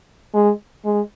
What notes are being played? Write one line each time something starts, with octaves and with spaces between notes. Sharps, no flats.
G#3
G#3